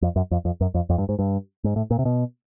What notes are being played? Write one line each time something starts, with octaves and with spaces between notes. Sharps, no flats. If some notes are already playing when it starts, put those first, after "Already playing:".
F2
F#2
F2
F2
F#2
F2
F2
G2
G#2
G2
G#2
A2
A#2
C3
B2